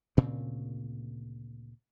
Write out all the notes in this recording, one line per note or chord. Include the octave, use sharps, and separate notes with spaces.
D2 A#2 C#3 C4